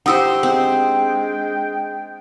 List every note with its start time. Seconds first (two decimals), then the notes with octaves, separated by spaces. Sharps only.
0.06 D#4 G4 C5 F#5 D#6 E6
0.43 G#3 C4 D4 G5